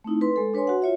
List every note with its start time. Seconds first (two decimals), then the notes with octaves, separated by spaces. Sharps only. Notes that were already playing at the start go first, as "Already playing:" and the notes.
0.04 A3 C4 D#4 E4
0.21 B4 C6
0.36 G#3 A4
0.54 D4 B4 C#5 G#5 C6
0.67 F#4 F#5
0.82 F4 C#5 E5